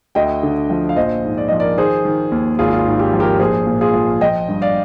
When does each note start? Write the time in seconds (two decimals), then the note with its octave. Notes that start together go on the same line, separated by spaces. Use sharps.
0.15 D2 D#5 G5
0.43 D3
0.70 F3
0.89 F5
0.96 A#1 C5 D#5
1.24 G#2
1.38 D5
1.48 F3 D#5
1.60 A#4 D5
1.77 D#3 G#4 C5
2.05 D#3
2.31 D#2
2.59 G#1 F4 G#4
2.79 F4
2.87 G#2
3.00 G4
3.13 F3
3.20 G4 A#4
3.40 A#1 G#4 C5
3.67 A#2
3.81 F4 G#4
3.94 F3
4.21 F3 D#5 G5
4.48 G2
4.62 D5 F5